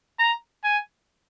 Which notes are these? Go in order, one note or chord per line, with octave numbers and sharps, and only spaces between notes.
A#5
G#5